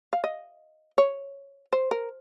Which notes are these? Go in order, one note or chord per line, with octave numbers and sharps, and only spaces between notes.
F5
D#5
C#5
C5
A#4